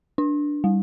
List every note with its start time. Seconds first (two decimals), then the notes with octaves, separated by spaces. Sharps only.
0.18 D4
0.64 G3